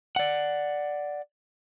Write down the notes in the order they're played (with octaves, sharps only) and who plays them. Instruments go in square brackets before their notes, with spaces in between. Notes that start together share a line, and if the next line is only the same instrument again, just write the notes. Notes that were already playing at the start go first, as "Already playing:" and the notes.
[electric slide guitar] D5 F#5